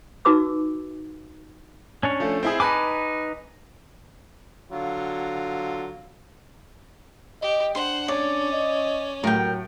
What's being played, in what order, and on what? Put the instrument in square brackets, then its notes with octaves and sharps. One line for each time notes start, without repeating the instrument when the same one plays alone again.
[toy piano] D#4 F#4 B4 D6 E6
[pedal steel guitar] C#4 D4 C#5
[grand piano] F3 A3
C4 E4 G#4
[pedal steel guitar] D#4 B4 D6 [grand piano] G#5 A5 B5
[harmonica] D3 F#3 F4
[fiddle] G4 [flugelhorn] D#5
[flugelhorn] D4 [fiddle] C5 F#5 [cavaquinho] C6
[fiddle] C#4 [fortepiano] C#5 [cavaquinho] D5
[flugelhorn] D#5
[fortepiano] A2 G4 [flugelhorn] F#3 [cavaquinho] A#4 G5